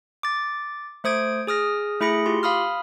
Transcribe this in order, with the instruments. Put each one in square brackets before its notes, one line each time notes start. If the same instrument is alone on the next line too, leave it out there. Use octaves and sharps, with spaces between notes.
[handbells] D6 A6
A3 C5 D#6 G#6 D7
G#4 D#6 F6 A#6
A3 E4 G#4 B5 A#6 C#7
F4 G4 C6
F5 B5 D#6 F6